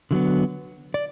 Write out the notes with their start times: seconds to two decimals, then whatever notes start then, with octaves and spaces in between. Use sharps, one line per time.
0.11 D3 F#3 B3
0.94 D5